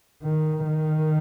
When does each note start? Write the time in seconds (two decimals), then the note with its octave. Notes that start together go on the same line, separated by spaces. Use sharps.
0.23 D#3
0.67 D#3